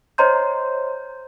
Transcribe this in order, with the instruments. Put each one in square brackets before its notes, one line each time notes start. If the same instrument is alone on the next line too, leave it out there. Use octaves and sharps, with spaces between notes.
[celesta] C5 C#5 D#5 A#5 C6 G6